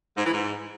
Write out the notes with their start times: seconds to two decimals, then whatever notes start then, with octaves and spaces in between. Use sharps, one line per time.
0.17 G#2
0.25 E3
0.33 G#2